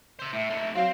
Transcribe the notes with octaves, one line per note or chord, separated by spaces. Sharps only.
C5 E5
A2 E5
A3 D#4
F#3 C4 F5